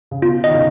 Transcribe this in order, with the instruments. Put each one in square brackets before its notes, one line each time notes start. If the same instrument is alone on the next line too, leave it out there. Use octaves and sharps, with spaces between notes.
[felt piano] C#3
[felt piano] B2 [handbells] F4
[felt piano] D#3 [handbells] D#5
[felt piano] C#3